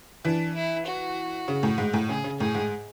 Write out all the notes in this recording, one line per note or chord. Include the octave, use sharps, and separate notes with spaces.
E3 D4
E4
F#4
C#3
A2
G#2
A2
C#3 G#4
C#3
A2 G#4
G#2